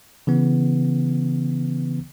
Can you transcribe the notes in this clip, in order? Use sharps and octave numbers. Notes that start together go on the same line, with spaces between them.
C#3 E3 B3